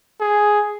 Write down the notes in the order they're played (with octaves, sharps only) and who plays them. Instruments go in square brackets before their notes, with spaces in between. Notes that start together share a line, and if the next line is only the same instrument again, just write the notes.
[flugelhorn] G#4